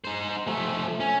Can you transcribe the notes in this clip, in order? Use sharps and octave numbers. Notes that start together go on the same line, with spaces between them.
D#4 C5
F3 A3
C#4